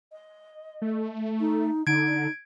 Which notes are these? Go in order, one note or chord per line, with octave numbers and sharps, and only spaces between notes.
D#5
A3
D#4
D3 D#4 G#6 D7